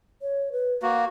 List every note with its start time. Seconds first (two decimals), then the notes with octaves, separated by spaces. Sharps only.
0.22 C#5
0.52 B4
0.82 A#3 F#4